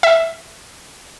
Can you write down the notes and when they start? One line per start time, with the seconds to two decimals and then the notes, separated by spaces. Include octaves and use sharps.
0.03 E5